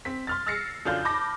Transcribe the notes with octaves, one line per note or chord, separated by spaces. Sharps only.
C4 B6
C6 F6 A6
E6 F6 A6 A#6 C7 C#7
F#2 D3 D4 F4 F6 G6
A5 B5 D6 G6 A#6